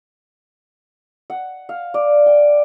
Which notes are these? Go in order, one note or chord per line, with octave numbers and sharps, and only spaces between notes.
F#5
F5
D5
G5